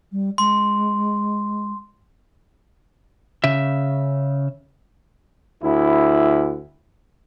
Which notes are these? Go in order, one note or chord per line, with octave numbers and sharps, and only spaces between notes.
G3
G#3 C6
C#3 E5
D2 E4